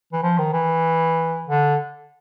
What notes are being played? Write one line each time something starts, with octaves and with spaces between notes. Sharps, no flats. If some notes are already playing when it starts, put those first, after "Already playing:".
E3
F3
D#3
E3
D3